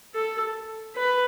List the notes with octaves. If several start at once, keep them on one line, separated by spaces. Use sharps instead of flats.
A4
B4